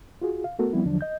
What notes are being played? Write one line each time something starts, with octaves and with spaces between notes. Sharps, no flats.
F4 F#4 G#4
F5
A3 B3 F#4 A4 A#4
F3 G3 B3 C4 E4
E2 D3 F3 F#3 D4
D#5 G6